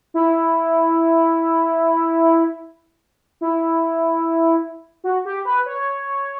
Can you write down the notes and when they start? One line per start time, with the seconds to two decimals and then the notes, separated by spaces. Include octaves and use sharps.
0.14 E4
3.41 E4
5.04 F#4
5.25 G4
5.45 B4
5.66 C#5